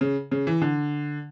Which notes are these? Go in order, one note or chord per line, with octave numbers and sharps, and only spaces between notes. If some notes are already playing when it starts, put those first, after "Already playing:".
C#3
C#3
E3
D3